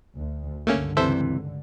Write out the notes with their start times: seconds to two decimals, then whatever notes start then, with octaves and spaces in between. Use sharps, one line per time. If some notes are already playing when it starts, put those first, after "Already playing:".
0.17 D2
0.67 C#2 G2 D3 A3 A#3 C#4
0.97 C3 E3 A4 C5 E5